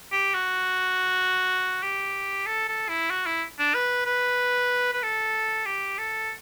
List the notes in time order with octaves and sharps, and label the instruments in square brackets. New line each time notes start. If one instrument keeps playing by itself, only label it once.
[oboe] G4
F#4
G4
A4
A4
E4
F#4
E4
D4
B4
B4
B4
A4
G4
A4